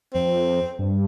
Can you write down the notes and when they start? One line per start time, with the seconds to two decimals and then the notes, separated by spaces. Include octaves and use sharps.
0.14 F2 C4
0.79 G2